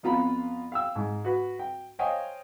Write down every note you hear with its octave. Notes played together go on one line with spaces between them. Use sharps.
F2 B3 F4 A#5 B5
F5 G5 E6
G#2
F#4 B4
G5
C5 C#5 D#5 F5 G5 G#5